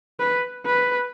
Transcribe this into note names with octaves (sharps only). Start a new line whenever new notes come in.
B4
B4